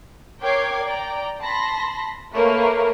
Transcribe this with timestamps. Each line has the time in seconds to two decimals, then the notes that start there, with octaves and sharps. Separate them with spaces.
0.42 A#4 C#5 G5 D6 G#6 C7
0.83 D5 G5 A#5
1.42 A5 B5 C6 A#6
2.33 A3 A#3 A#4 B4 C#5